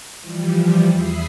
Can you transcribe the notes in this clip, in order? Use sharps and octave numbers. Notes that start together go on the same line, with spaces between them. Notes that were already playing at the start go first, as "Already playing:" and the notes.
E3 F3 G3
E2 E5 B5 D#6 C7